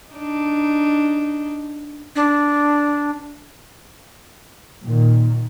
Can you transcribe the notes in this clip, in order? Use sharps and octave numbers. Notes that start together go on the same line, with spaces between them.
D4 D#4
D4
A#2 D#3